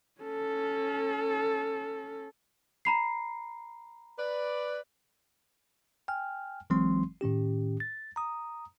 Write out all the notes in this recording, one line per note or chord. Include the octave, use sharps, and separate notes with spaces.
C#4 A4
A#5 B5 C7
B4 D5
G5 G#5 F6
G1 E3 F#3 G#3 C4 C6
A2 D#3 C#4 G4
A6
A#5 D#6